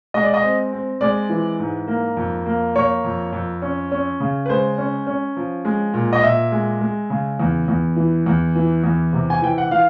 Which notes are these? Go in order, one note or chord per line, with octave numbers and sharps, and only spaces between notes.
G#3 D#5
D5
D#5
C4
C4
G#3 D5
E3
G#2
A#3
F2
A#3
A#3 C#5
F2
F2
C#4
C#4
C#3
B4
G#3 C5
C#4
C#4
F3
G#3
A#2
D#5
A#2 E5
G#3
G#3
C#3
E2
E2
E3
E2
E3
E2
C3
G#5
E3 G5
F#5
E3 F5